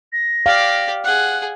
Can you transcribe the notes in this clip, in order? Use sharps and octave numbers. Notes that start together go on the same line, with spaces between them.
A#6
G4 D5 F5
G#4 F#5 F#6